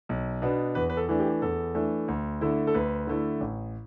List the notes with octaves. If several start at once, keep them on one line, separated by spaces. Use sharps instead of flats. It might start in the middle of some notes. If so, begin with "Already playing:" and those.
B1
B2 B3 D4
E2 B4
B4
A4
E3 A3 D4
G4
E2 A4
E3 A3 D4
D2
D3 A3 E4
A4
D2 B4
D3 A3 E4
A1